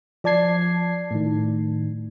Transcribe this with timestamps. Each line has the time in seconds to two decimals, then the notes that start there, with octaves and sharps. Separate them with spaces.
0.24 F3 D5 A5 G#6 C7
1.11 A2 D#3